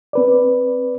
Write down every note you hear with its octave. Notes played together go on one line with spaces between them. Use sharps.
C4 B4 D5